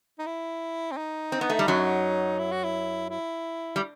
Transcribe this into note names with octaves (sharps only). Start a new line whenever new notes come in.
D#4
E4
C4
D#4
C4
B3
A3
G3
F#2 F#3
E4
F#4
E4
E4
G3